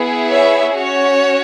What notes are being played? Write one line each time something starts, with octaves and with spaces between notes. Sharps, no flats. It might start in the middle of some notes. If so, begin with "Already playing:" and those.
Already playing: B3 E4 G#4
C#5 E5
C#4 F#4 C#5